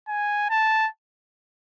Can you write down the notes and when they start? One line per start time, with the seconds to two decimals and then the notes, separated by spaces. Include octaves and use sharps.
0.08 G#5
0.50 A5